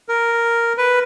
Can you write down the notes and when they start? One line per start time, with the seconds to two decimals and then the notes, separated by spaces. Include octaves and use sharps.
0.09 A#4
0.77 B4